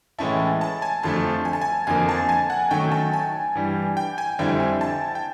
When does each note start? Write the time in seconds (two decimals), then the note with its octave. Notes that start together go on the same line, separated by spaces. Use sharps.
0.18 A2 E3 G#3 C#4 E4 A5
0.61 A5
0.82 G#5
1.03 F2 D3 F3 A3 A5
1.45 G#5
1.53 A5
1.61 G#5
1.87 F2 D3 F3 A#3 G#5
2.09 A5
2.29 G#5
2.50 F#5
2.71 D#3 F#3 A3 C#4 F#4 G5
2.92 A5
3.13 G#5
3.55 G2 E3 G3
3.97 G5
4.18 G#5
4.39 F2 D3 G3 C4 E4 G5
4.60 G#5
4.81 A5
5.15 G5